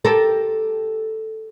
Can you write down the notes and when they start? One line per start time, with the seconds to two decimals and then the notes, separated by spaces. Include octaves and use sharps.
0.05 G4 A4 A#4